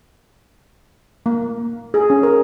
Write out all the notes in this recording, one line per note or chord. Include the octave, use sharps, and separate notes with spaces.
A#3
G#4
C#4
A#4